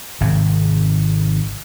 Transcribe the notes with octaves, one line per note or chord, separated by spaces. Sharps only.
G#1 G#2 C3 D#3